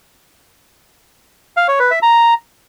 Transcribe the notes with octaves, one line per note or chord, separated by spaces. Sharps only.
F5
C#5
B4
E5
A#5